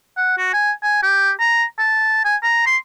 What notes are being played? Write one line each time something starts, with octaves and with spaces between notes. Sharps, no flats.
F#5
F#4
G#5
G#5
G4
A#5
A5
G#5
A#5
C6